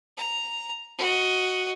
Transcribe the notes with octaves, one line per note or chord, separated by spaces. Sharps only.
A#5
F#4 D#5